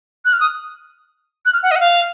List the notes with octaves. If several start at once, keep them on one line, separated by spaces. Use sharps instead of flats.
F#6
F6
D#6
F#6
F6
F#5
D#5
F#5
F5